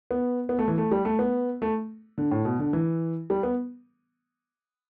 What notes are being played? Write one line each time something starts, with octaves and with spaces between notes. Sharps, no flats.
B3
B3
A3
E3
A3
G3
A3
B3
A3
D3
A2
B2
D3
E3
G3
B3